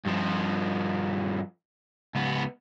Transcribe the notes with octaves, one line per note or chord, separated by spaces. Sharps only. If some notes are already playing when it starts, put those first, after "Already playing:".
G2 F3
C#2 B3